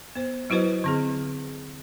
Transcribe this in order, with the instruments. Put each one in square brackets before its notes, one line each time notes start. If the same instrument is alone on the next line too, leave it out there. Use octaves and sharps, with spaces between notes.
[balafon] B3 C5
F#3 E4 F#4 B4 C5 D#5
D3 C4 G#4